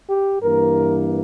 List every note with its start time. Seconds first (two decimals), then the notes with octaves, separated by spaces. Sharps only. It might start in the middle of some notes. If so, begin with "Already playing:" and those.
0.10 G4
0.42 G2 E3 A#3 A#4